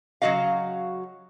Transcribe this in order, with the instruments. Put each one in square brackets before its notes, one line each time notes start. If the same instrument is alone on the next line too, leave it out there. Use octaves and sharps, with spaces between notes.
[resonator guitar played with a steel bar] C#3 F#3 G#3 F#4 D#5 F5